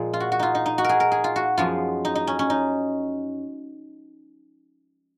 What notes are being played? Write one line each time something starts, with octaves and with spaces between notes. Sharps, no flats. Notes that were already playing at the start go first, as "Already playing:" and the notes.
Already playing: A#2 F3 G#3 G#4
F4
F#4
F#4
D#4 F4
D#4
D#4
F#4
G#4 A#4
A#4
G#4
F4
F#4
F#2 F3 G#3 B3 F4
D#4
D#4
C#4
C#4
D#4